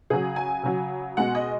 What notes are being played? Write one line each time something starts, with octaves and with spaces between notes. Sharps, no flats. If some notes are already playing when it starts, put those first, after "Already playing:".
C#3 F#3 G#4
G#5
C#3 F#3
B2 G#3 F#5
D#5